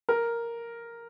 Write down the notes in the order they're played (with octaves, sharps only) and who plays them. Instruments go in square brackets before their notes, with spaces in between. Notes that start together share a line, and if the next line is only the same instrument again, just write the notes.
[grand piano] A#4